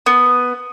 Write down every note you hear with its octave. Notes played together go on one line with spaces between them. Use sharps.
B3